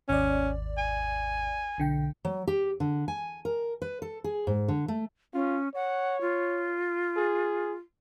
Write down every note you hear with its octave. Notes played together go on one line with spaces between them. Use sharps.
G#1 D#2 C#4 D5
G#5
B1 D3 G5
F#3
G4
D3
G#5
A#4
B4
A4
G#4
G#2
D3
A3
C#4 F4
C#5 F#5
F4
G#4